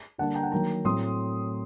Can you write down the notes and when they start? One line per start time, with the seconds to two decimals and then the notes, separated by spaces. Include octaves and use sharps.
0.18 D3 G3 A#3 D4 F#5 A5
0.35 G5 A#5
0.43 F#5 A5
0.51 D#3 F#3 A#3 G5 A#5
0.85 A2 F#3 A3 C4 C6 D#6